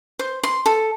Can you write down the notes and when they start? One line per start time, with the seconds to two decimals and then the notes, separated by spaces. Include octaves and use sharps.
0.19 C5
0.43 C6
0.66 A4